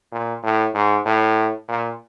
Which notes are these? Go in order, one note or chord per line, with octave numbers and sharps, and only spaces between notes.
A#2
A2
G#2
A2
A#2